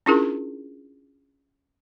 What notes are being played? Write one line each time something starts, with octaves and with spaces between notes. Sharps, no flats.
C#4 D4 E4 F4 G#4 A#4